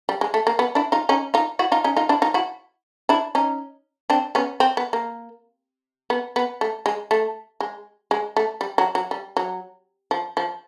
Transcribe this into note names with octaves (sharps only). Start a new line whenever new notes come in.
G3
G#3
A3
A#3
B3
D4 E4
D#4 F4
C#4 D#4
D#4 F4
E4 F#4
D#4 F4
C#4 D#4
D#4 F4
D4 E4
D#4 F4
E4 F#4
D4 E4
C#4 D#4
C4 D4
B3 C#4
C4
B3
A#3
B3
B3
A3
G#3
A3
G#3
G#3
A3
G3
F#3
F#3
G3
F#3
F3
F3